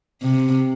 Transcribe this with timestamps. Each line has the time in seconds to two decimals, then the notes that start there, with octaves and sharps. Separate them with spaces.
0.21 C3